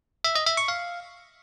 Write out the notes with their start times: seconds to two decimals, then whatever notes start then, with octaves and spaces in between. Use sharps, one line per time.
0.24 E5
0.35 D#5
0.46 E5
0.57 C#6
0.68 F5